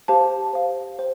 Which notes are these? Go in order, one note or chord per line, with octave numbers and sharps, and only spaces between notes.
G4 C5 F5 A5
C5 F5
C5